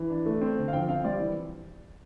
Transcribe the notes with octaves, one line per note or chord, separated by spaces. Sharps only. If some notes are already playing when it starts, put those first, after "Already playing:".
Already playing: E3
D4
A3
C4
D3
F5
F3 G5
C4 F5
G3 D5
E3